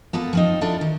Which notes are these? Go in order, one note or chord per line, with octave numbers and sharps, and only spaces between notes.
A#3 B3 F4 A4
F3 C4 D#4
D4 E4 F4 A4
D#3